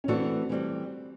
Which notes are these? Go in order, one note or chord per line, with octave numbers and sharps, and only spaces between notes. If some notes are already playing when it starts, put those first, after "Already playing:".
C#4
E3 A3 C4 D4 F#4
E3 G3 C4